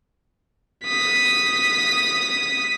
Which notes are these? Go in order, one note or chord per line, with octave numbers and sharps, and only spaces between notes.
D#6 B6